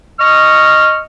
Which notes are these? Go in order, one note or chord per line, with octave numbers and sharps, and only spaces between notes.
D#5 C#6 F6